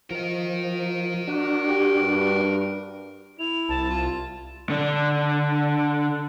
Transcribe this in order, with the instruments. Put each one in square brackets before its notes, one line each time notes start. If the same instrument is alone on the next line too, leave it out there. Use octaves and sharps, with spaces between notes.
[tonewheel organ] F3 [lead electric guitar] A#4 D#5
[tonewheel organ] D4 F#4
[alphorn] G4
G2
[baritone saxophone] E4 [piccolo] F7
[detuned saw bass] C2 [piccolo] A5
[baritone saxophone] F4
[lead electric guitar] D3 D4